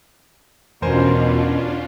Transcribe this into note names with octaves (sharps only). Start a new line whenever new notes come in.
E2 B2 C#4 D4 F4 A#4 C5 G#5